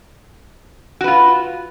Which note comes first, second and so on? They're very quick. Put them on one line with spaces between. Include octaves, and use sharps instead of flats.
F#4 B4 F4